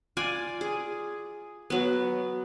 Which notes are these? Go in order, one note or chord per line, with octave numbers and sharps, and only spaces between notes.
F4 D5 G#5
G#4
F#3 B3